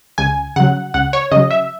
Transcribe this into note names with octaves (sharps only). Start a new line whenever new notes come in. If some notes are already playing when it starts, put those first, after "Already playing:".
C#2 G#5
C#3 F#3 F#5
C#2 F#5
C#5
C#3 F#3 D#5
E5